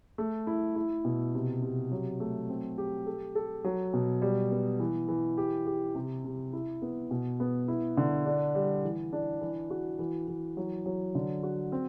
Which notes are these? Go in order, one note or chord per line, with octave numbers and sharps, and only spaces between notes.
A3
E4
E4
B2
C3
C3
F#3
A3
C4
G4
A4
A4
F#3
B2
G3
B3
E3
E3
G4
G4
C3
C3
E4
B3
B2
B3
E4
D3
D4
G3
E3
D4
E3
F#4
E3
E3
F#3
F#3
D3
F#4
C4